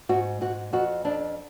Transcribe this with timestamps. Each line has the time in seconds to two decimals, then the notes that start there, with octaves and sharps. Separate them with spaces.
0.09 G#2 F#4
0.41 G#2 F#4
0.73 F2 F#4
1.05 F2 D4